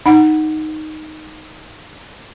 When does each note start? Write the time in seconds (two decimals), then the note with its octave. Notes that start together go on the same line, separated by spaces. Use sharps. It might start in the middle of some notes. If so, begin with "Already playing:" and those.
0.06 D#4 F#5